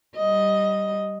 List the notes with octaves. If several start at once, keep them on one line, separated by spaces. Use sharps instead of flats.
G3 D#5